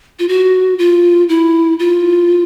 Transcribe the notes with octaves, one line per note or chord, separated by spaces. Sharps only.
F4
F#4
F4
E4
F4